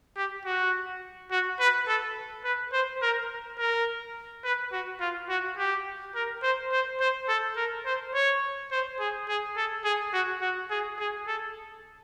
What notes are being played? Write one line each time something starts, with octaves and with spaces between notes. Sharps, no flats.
G4
F#4
F#4
B4
A4
B4
C5
A#4
A#4
B4
F#4
F4
F#4
G4
A#4
C5
C5
C5
A4
A#4
C5
C#5
C5
G#4
G#4
A4
G#4
F#4
F#4
G#4
G#4
A4